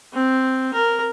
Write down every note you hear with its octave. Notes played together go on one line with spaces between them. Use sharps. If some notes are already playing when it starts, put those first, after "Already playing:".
C4
A#4